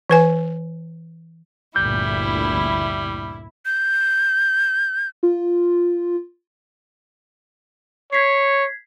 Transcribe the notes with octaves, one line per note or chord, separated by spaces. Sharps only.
E3 B4 G#5
G1 D2 A#2 G3 E4 G6
G6
F4
C#5 G#6 B6 C7